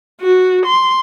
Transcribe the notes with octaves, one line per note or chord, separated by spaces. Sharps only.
F#4
C6